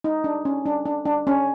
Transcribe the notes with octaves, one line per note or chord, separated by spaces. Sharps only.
D#4
D4
C#4
D4
D4
D4
C#4